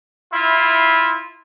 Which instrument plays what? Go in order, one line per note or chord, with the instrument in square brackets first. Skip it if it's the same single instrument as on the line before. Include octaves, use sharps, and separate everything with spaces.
[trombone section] E4 F4